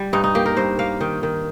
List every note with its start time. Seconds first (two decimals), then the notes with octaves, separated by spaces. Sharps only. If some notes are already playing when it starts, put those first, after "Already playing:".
Already playing: G3
0.13 G2 D#4
0.24 D#4
0.35 A#3 G4
0.46 A#4
0.57 G2 C5
0.79 A#3 F5
1.01 D#3 G5
1.23 D#3